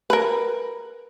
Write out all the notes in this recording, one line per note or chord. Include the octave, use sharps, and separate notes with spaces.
A#4 B4